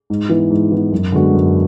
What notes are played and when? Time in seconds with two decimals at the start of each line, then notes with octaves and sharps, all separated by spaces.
0.10 G#2
0.29 E3 B3
0.50 G#2
0.72 E3 B3
0.92 F#2
1.12 D3 G#3 B3 F#4
1.33 F#2